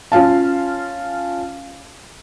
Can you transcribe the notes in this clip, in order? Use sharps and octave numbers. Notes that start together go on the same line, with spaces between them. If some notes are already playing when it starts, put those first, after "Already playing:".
C#4 F4 F5 A5